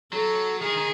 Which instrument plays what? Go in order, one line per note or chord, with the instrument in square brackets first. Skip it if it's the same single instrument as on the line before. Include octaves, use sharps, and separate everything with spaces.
[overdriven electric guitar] F#3 [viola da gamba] A4
[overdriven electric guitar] D#3 [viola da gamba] G#4
[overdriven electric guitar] D#3